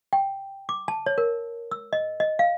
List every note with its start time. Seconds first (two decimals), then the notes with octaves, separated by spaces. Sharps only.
0.13 G5
0.69 D6
0.88 A5
1.06 C#5
1.18 A#4
1.71 E6
1.93 D#5
2.20 D#5
2.39 F5